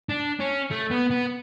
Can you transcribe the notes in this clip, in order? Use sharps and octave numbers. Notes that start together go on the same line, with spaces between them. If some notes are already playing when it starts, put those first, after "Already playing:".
D4
C#4
A3
B3
B3